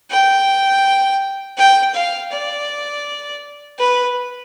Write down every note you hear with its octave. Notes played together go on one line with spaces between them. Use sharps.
G5
G5
F5
D5
B4